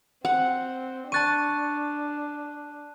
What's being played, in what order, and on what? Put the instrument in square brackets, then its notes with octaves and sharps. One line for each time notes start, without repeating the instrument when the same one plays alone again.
[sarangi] C4 [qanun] F#5
[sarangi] D4 [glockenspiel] A5 F#6 D#7 [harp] C#6 A6